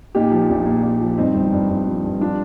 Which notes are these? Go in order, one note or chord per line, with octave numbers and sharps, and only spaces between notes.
A#2 D#4 G4
F3
A#1
A#2
A#2
F3
G2 C4 D#4
G1
G2
G2
F3
G2
F3 D4 F4